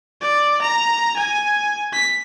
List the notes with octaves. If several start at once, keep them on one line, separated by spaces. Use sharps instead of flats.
D5
A#5
G#5
B6